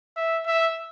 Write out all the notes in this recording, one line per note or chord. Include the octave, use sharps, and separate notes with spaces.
E5
E5